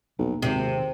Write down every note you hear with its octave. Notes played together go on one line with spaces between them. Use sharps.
F1 B1 A#3
G#1 D#2 C3 D#3